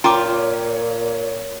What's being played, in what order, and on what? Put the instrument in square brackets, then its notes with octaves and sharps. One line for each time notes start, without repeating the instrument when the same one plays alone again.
[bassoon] A#2 [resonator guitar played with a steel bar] F4 G5 [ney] C#5 [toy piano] A#5 D6